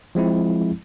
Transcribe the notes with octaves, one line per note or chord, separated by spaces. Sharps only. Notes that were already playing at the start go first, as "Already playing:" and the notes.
F3 G#3 C4 E4